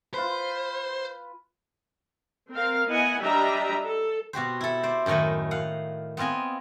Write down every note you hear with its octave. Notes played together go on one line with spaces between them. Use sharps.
F4 B4 C5
C4 A#4 F5
B3 E4 D#5 F#5 G#5
G3 D4 G4 D#5 E5 A#5
A4
B2 F#4 G4 C5
E4 A4
C5 D5
F#2 A2 D#3 A3 D#5
F5 F#5
B3 C4 F4 D#5 G#5